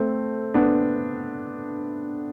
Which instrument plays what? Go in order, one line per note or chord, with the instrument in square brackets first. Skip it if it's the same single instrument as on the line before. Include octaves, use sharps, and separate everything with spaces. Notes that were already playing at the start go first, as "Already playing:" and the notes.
Already playing: [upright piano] A3 C4
B3 D4